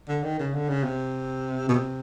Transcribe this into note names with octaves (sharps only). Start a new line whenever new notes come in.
D3
D#3
C#3
D3
C#3
C3
B2
C3